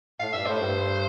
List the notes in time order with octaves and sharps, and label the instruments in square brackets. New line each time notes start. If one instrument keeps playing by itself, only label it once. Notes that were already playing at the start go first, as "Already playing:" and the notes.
[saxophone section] A2 [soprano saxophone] F5
[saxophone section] G2 [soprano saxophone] E5
[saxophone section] A2 [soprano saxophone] C5
[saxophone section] G2